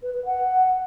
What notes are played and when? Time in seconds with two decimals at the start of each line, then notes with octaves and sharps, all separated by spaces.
0.03 B4
0.14 B4
0.25 F#5